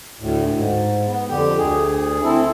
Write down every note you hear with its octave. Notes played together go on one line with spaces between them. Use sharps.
D2 A2
G#2
B3
F2 D3 G4
D2 G#4
C4 E4 A4